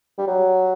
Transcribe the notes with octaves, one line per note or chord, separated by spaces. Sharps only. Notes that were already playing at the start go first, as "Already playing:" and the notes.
G3
F#3